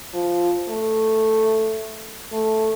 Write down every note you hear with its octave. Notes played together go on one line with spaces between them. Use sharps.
F3
A3
A3